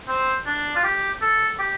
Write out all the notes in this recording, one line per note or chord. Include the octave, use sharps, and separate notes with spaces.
C4
D4
F4
G4
A4
G4